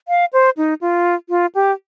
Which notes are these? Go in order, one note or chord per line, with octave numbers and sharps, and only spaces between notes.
F5
C5
D#4
F4
F4
G4